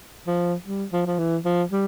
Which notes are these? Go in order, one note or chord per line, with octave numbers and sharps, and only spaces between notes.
F3
G3
F3
F3
E3
F3
G3